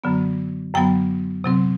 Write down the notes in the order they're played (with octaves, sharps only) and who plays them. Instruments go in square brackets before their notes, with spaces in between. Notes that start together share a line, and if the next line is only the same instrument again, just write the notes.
[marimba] F#2 D3 F#3 B3
F#2 D3 F#3 B3 G5
C3 F#3 C4